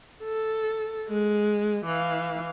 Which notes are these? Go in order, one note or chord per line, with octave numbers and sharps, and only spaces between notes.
A4
G#3
E3 F5